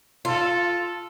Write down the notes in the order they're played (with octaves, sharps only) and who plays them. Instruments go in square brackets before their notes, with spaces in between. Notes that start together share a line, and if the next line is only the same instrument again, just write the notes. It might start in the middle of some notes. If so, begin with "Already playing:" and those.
[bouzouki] F4 [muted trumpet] A4